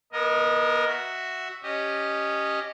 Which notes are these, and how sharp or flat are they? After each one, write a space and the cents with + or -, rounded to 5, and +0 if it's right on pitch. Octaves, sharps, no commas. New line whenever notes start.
B3 -30 A#4 +0 D#5 +0
F#4 +0 E5 +0
C#4 +0 G4 +0 D#5 -15